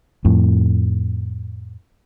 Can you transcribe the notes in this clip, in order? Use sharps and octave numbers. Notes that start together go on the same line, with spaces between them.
F2 A2